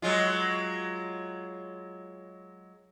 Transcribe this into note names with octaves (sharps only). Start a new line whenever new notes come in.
F#3 G#3 F4